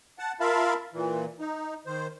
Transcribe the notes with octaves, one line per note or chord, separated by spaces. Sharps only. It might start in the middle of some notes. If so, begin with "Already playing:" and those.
F#5 A5
F4 A#4 E5 F5 A5 B5
A#2 E3
D#4
D#3 C5